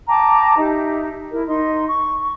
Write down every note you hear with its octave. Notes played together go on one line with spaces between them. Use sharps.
G5 A5 A#5 D6
D#4 G4 E5
E4 A#4
D#4 C6
C#6